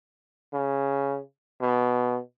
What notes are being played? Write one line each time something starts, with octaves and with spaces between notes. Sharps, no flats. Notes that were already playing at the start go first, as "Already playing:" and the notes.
C#3
B2